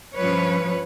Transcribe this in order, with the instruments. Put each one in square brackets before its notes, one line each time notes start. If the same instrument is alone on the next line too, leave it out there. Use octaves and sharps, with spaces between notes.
[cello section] G2 F3 C#4 B4 C#5